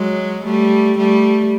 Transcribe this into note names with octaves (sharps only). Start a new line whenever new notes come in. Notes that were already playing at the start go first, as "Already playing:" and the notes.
Already playing: F#3 G#3
G3 A3
G3 A3